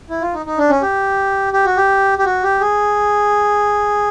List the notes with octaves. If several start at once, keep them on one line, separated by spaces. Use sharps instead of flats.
E4
F4
D#4
D#4
D4
C#4
G4
G4
F#4
G4
G4
F#4
G4
G#4